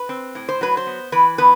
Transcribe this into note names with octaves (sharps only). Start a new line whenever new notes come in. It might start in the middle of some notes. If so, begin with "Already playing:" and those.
Already playing: B4
C4
A2
C5
F#3 B4
C5
B3
E3 B4
B3 B4